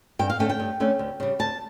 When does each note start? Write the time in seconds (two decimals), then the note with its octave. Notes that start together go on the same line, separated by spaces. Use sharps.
0.19 G2 G5
0.30 F5
0.39 D3 A3 C#4 G5
0.49 G5
0.60 G2
0.80 D3 A3 C#4
0.99 D2
1.20 C#3 G3
1.39 D2 A5